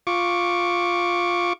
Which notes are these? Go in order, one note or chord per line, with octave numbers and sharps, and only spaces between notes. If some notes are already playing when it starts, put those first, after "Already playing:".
F4 C#6 D6